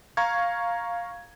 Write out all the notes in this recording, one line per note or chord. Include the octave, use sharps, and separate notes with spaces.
F5 A#5 C#6 G#6